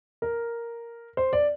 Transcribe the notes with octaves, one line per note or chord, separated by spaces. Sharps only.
A#4
C5
D5